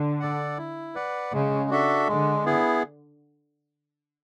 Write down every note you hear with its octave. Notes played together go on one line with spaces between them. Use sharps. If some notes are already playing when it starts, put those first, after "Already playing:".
Already playing: D3
A4 D5 F#5
E4
B4 D5 F#5
C#3 G#3
D4 F#4 A4 E5
D3 G#3
B3 E4 G#4